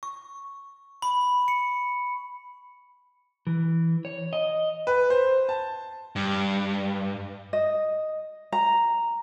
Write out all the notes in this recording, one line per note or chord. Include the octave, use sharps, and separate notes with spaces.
C#6
B5
C#7
E3
C#5
D#5
B4
C5
A5
G2
D#5
A#5